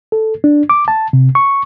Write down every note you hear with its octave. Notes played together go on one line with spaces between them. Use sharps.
A4
D4
D6
A5
C3
C#6